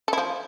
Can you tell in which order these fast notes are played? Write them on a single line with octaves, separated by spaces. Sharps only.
A4 E4 F3